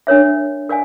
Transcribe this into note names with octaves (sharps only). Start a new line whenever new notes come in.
D4 A#4 C#5 E5
A#4 D5 F5 G#5